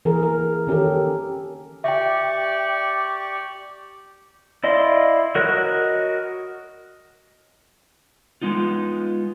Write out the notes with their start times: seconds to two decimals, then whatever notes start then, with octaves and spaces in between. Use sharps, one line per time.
0.05 E3 G#4 A#4
0.23 A#4
0.67 D#3 C#4 G4 A4 A#4
1.84 G4 D5 E5 G5 C#6
4.64 E4 D5 D#5 F5 C6
5.35 F#4 A#4 C#5 D#5 F#6
8.42 G#3 B3 D#4 F4